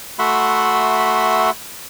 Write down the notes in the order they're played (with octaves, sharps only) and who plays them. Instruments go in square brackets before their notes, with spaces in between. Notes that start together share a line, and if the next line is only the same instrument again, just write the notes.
[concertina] A3 F#4 E5 F#5 B5 C6